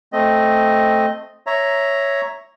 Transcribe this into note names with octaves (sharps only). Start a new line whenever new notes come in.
A3 C4 D#5
C#5 E5 A#5